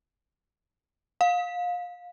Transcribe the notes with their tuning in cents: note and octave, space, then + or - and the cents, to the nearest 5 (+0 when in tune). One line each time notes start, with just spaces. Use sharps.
F5 +25